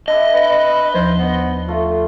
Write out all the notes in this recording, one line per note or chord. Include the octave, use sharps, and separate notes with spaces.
D4 E4 D#5 E5
B4
D#2 F3 C5
B3
A3 F4